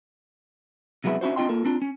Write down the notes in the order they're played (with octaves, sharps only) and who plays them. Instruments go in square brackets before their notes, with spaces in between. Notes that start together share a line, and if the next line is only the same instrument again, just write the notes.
[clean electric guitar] C3 F#3 G#3 B3 E4 G#4
C#4 D4 E4 F#4 C5
C4 D4 F4 D#5 G5 C6
A#3 F4 A4 A#4
C4 D4 F4
C#4